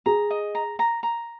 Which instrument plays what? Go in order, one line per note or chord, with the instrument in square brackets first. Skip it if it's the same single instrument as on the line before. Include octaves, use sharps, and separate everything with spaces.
[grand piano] G#4 [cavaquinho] A#5
[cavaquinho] D#5
A#5
A#5
A#5